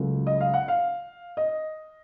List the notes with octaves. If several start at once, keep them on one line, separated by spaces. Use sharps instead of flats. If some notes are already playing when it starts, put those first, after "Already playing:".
Already playing: C#2 C#3 F#3 A3
D#5
F5
F#5
F5
D#5